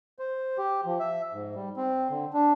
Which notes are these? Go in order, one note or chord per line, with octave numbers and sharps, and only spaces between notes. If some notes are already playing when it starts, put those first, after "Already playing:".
C5
G4
F3
E5
G#2
G3
C4
D3
D4